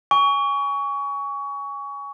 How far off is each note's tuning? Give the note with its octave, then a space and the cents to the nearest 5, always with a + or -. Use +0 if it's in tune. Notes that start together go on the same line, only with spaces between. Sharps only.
G#5 -15 C#6 +25